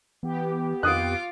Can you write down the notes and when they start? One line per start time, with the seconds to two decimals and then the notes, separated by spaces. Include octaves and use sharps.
0.23 E3 B3 G4
0.83 F2 F4 F5 D6 D#6 F#6